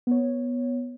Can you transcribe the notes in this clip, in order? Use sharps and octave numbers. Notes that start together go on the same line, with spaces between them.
B3 C#5